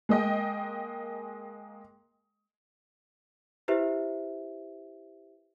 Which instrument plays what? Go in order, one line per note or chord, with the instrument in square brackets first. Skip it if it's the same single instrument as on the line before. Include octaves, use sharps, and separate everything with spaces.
[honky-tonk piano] G#3 A#3 D#5 G5
[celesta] E4 G4 B4 C5 E5